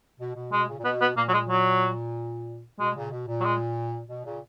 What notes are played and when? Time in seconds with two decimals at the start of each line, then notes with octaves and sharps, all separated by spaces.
0.20 B2
0.36 B2
0.52 B2 G#3
0.68 A#2 C#3
0.78 A#2
0.85 B2 B3
1.01 B3
1.17 A#2 A#3
1.29 F#3
1.34 G#3
1.49 F#3
2.79 B2 G#3
2.95 A#2 C#3
3.12 B2
3.28 A#2
3.41 F#3
3.44 G#3
4.09 B2
4.25 A#2 C#3